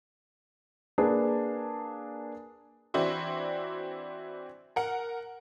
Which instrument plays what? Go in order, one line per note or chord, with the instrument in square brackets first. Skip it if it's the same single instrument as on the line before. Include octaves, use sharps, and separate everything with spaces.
[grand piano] A#3 D4 G#4 B4 A5
[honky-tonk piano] E3 C4 D4 E4 F#4
A#4 F#5